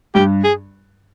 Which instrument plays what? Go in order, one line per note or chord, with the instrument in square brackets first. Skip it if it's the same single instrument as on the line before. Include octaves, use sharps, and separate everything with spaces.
[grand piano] G2 [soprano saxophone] G4
[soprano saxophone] G#4